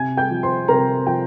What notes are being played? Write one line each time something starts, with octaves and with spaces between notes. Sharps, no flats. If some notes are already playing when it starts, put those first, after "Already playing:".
Already playing: C3 G#5 G#6
G5 G6
F3
C5 C6
C3 A#4 A#5
F3 G5